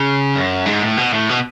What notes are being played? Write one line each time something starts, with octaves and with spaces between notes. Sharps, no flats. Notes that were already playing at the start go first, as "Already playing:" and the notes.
Already playing: C#3
F#2
G#2
A2
B2
A2
B2